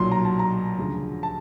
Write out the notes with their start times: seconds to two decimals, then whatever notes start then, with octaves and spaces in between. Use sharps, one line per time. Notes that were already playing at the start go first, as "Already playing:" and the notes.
Already playing: B1 A#2 F#3 C6
0.12 A#5
0.25 A5
0.39 A#5
0.78 D2 C#3 F3
1.23 A5